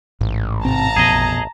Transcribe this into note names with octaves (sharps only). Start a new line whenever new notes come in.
A1 G#2
G#2 C3 C4 A5 A#5
A#1 F2 B2 G#4 D#5